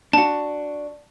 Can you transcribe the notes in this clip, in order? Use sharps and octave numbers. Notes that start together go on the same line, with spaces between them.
D4 F#4 A5